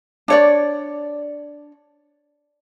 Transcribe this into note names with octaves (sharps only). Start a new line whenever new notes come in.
D4 C#5 D5